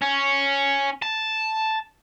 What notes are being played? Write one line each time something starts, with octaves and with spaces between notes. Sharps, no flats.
C#4
A5